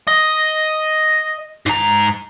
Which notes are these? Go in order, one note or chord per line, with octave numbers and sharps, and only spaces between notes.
D#5
G#2 A#5